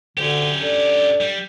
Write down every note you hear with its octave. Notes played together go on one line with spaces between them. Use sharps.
D2 D3 C#4 G4
D4 A4
G3